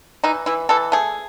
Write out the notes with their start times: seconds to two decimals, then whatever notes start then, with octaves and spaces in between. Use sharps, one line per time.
0.24 E3 D#4
0.46 E3 E4
0.69 E3 A4
0.92 A3 G#4